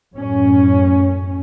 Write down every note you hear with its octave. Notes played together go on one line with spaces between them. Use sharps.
F#2 A2 C#4